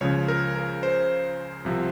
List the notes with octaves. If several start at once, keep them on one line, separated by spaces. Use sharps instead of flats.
C#2 C#3 F3 C#5
A#4
A#4
C5
C2 C3 F3